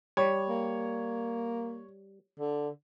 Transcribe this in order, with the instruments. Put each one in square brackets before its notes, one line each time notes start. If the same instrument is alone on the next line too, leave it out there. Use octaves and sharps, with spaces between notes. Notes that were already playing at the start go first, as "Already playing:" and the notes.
[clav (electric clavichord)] G3 [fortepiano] C#5
[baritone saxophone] A#3
D3